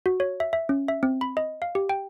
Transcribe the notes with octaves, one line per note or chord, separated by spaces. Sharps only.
F#4
C#5
E5
E5
C#4
E5
C4
B5
D#5
F5
G4
G5